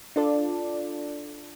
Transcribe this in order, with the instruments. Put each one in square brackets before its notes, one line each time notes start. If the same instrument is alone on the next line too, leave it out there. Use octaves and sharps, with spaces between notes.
[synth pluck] D4 F4 A4 D5